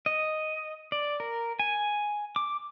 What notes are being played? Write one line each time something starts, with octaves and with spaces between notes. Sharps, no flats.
D#5
D5
A#4
G#5
D6